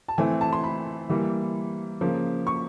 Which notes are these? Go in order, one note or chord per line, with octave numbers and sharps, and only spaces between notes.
A5
E3 A3 C4 G#5
A5
C6
B5
E3 G3 A#3
C#3 F3 A#3
C#6